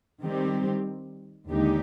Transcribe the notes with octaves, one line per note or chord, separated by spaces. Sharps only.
D#3 G3 C4 G4
D#2 D3 G#3 D#4 G4